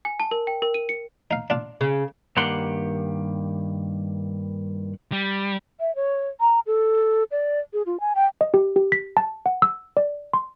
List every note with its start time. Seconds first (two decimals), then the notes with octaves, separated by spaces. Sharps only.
0.05 G#5
0.20 A5
0.31 A#4
0.47 G5
0.62 A#4
0.74 D#7
0.89 C#7
1.31 D#4 F5
1.50 D4 F4
1.81 C#3
2.37 G2 D#3 A#3 G4 F#5 C6
5.12 G3
5.80 E5
5.95 C#5
6.41 A#5
6.67 A4
7.31 D5
7.73 G#4
7.86 F4
8.00 G#5
8.15 G5
8.41 D#5
8.54 G4
8.76 G4
8.92 B6
9.17 A5
9.46 F#5
9.62 E6
9.97 D5
10.33 C6